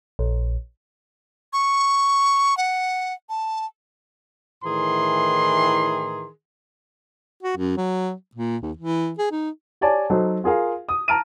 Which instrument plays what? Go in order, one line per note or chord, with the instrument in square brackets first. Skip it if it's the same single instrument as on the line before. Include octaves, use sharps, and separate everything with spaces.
[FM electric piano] A#1
[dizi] C#6
F#5
A5
[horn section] A2 D#3 E3 G#4 A#5 C6
[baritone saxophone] F#4
F#2
F#3
A#2
D#2
E3
G#4
D#4
[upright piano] G4 C#5 D5 G#5 A5
F#3 D#4 A4 C5
F4 G#4 A#4 F5
D#6
A5 A#5 F6 D7 D#7